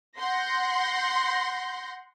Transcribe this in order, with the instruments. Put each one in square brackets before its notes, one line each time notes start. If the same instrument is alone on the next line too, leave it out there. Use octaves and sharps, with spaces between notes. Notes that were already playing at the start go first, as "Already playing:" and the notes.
[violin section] F#5 C6 G6 A#6